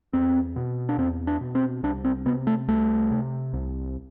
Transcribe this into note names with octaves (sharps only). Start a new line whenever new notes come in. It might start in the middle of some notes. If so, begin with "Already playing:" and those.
E2 C4
B2
D4
E2 C4
D4
B2
C4
C2 D4
C4
C3 B3
A3
C2 A3
C3
C2